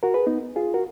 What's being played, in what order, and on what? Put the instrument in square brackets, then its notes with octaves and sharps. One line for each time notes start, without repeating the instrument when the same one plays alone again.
[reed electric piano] F#4 A#4
G#4 B4
B3 D#4
F4 G#4
F#4 A#4